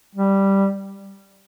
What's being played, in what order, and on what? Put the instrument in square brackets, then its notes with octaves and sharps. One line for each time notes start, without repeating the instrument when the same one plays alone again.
[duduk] G3